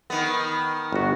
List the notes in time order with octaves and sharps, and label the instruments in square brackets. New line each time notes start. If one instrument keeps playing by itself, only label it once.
[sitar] D#3 B3
[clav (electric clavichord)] G1 F#4